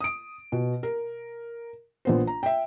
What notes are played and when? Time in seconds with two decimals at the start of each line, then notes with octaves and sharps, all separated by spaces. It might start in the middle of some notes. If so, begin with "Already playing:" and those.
0.01 D#6 D7
0.52 B2
0.83 A#4
2.05 A#1 B3 C5
2.27 A#5
2.43 E5 G5